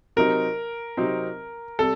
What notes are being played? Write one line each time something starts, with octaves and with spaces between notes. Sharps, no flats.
C3 F#3 C4 D#4 A#4
C3 F#3 C4 D#4
C3 G3 A4